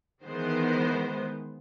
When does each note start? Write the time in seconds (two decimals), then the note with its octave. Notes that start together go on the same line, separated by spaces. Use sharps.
0.24 D#3 E3 G#3 B3 C5